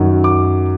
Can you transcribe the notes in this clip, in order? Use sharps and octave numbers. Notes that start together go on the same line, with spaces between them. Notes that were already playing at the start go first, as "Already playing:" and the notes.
Already playing: F#2 D#3 F#3
D6